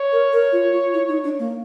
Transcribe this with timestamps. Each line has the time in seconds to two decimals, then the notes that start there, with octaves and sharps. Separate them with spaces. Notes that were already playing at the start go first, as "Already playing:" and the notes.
Already playing: C#5
0.12 A#4
0.32 A#4
0.52 F4
0.73 F4
0.94 E4
1.08 D#4
1.24 D4
1.39 A#3